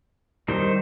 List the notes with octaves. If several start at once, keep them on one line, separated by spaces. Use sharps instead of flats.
D#3 G3 D#4 C5